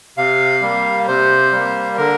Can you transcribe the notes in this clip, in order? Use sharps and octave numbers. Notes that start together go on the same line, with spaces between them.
C3 F5
G3 A#3
C3 C5
G3 A#3
D3 A#4